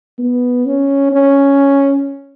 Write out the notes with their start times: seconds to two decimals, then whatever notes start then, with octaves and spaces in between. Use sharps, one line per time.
0.18 B3
0.66 C#4
1.12 C#4